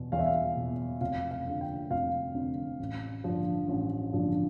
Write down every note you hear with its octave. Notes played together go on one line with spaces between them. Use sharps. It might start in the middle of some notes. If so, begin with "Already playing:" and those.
Already playing: E2 B2
E2 F5
E5
F5
B2
F1 F5
F5
F2 D3
G5
F1 F5
F2 D3
A1
G2 D3 F3
A1
G2 D3 F3